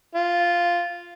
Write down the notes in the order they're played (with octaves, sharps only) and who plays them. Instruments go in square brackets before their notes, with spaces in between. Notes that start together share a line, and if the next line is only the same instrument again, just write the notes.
[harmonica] F4